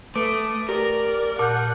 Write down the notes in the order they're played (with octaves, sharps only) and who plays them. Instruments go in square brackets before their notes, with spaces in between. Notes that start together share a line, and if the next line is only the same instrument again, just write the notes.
[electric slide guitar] A3 [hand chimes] B4 D6 D7 [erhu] D#6
[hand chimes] G4 [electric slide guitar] A#4 [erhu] D5
[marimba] A#2 [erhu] F#5 [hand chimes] A5 F6 G6